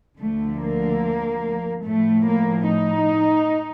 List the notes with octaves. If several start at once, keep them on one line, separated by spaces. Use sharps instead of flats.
D2 D3 F3 A3
A#3
A2 F3 A3
A#3
D#4